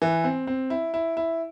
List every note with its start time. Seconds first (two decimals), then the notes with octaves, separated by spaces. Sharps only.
0.02 E3
0.24 C4
0.47 C4
0.70 E4
0.94 E4
1.17 E4